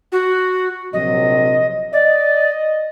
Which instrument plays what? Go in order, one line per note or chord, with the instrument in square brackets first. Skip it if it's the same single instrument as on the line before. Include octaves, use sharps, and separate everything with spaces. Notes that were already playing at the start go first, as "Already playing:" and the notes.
[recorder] F#4
[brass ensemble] A#1 C3 F#3 [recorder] D#5
[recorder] D5 [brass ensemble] D#5